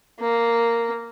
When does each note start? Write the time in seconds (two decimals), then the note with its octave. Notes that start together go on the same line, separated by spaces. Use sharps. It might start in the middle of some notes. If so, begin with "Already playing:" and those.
0.20 A#3